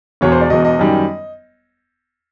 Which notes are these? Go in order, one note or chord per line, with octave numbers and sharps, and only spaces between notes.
E1 E2 B2 C#5
C5
D5
E1 E2 B2 D#5
D#5
F#2 D#3 G3